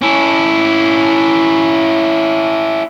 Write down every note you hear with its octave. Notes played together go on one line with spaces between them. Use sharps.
C#4 E4